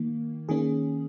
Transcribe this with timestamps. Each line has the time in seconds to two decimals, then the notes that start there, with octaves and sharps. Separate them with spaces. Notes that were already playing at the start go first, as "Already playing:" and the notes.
Already playing: D#3 A#3
0.49 D#3 A#3 C#4 G#4